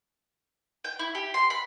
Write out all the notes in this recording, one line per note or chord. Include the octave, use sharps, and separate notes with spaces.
G5
E4
G4
C6
B5